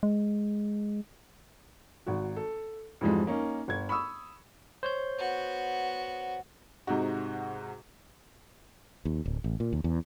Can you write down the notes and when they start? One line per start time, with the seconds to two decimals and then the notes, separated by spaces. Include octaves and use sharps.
0.03 G#3
2.07 G#1 F#4
2.36 A4
3.01 F2 G#2 E3 F3 G3 G#3
3.27 A#3 C#4 D#4
3.68 G1 G#6
3.89 B5 C#6 D#6 E6
4.83 C5 C#5 G6
5.18 B3 F#4
6.87 G#2 C3 D#4 F#4
9.05 D#2
9.25 D1
9.44 A1
9.60 A#2
9.73 D#2
9.84 E2